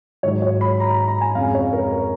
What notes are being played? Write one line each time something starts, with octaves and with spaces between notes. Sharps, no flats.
G#2 D#3 F#3 C#5
C#5
B5
A#5
A#5
A#5
G#5
F2 C#3 G#3 F5
C#5
A#4
A#4